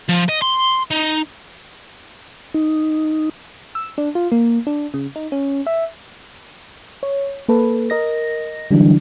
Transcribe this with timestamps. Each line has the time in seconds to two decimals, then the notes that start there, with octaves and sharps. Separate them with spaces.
0.09 F3
0.29 D#5
0.42 C6
0.91 D#4
2.54 D#4
3.75 E6
3.98 D4
4.15 F4
4.32 A#3
4.67 D4
4.94 C#3
5.16 D#4
5.32 C#4
5.67 E5
7.03 C#5
7.49 A#3 A4 B4
7.90 A#4 D#5 A#6
8.71 D3 E3 F#3 G3 D4